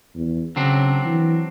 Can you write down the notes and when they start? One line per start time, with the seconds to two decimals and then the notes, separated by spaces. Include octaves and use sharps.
0.15 E2
0.56 C#3 F#3 C4 D4
1.05 E3